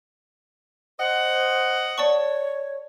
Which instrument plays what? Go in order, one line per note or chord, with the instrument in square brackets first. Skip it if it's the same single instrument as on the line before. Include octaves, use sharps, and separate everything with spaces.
[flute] C5 [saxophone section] D#5 F#5
[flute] C#5 [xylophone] D5 A5 C#6